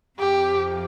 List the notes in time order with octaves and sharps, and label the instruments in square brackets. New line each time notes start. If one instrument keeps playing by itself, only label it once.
[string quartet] F2 C3 F3 [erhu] G4